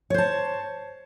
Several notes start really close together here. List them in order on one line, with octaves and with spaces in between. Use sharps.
C#5 C5 A5